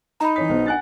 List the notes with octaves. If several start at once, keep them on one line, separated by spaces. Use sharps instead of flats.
D#4 A#5 B5
E3 C#5 D#6 B6
B1 B3 C5
D4 F#5 G#5 F#6 A6